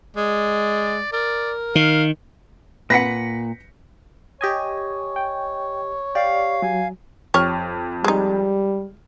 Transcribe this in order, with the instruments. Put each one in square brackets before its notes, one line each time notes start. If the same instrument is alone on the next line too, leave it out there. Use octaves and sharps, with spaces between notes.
[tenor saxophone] G#3 [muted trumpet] D5
[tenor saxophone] A#4 [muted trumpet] D5
[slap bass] D#3 [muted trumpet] F5
[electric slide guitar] A#2 [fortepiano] B4 F#5 [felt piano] A#6 B6 C#7
[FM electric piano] G4 D#5 G#5 [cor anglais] C#5
[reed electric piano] G5
[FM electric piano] G4 [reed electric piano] D5 [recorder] F5
[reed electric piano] F#3 [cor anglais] G#5
[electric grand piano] F2 F6 [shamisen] G4 C#5
[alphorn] G3 [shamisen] G#3 D#4